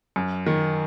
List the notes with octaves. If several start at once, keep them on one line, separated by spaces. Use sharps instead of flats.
F#2
D#3